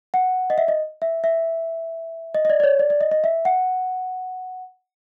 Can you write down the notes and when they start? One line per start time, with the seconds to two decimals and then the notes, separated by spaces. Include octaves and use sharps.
0.14 F#5
0.50 D#5
0.58 E5
0.68 D#5
1.02 E5
1.24 E5
2.35 D#5
2.45 D#5
2.50 D5
2.60 D5
2.64 C#5
2.79 D5
2.90 D5
3.01 D#5
3.11 D#5
3.24 E5
3.45 F#5